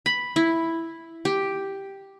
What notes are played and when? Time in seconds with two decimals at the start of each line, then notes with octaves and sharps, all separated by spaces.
0.06 B5
0.36 E4
1.25 G4